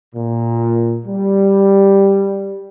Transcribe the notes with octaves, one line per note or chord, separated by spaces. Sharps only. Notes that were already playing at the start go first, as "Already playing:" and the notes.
A#2
G3